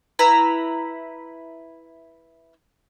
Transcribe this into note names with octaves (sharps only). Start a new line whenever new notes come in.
E4 B4 A#5